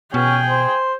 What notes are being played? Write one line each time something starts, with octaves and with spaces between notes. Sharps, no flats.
B2 C#4 G#4 G5
C5